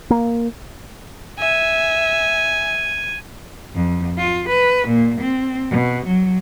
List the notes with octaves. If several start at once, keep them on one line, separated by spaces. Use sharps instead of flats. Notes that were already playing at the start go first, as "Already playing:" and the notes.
A#3
E5 G#5
F2
F4
B4
A#2
C4
B2
F#3